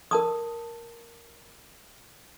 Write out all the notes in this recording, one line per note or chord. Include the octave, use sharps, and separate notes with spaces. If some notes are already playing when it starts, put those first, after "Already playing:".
A#4 A5 D#6